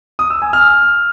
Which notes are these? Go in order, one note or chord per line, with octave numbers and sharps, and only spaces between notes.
D#6
E6
G#5
F6